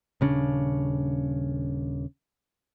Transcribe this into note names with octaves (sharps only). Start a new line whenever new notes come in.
D#1 C#3 C#4 D4